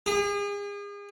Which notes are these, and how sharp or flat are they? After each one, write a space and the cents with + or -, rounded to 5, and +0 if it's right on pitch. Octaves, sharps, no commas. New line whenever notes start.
G#4 -40